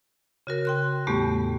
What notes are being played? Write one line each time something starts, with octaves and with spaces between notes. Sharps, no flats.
C#3 F#4 A#4
G5 C6 F#6
E2 A2 G3 A3 B3 G4